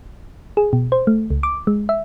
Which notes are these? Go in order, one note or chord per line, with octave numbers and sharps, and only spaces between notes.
G#4
B2
C5
A3
C#2
D6
G#3
E5